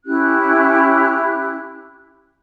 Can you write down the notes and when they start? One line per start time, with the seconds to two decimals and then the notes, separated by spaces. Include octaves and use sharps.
0.05 C#4 E4 G4 F#6